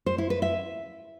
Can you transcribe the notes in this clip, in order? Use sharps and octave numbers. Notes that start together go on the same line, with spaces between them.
C5
E4
B4
E5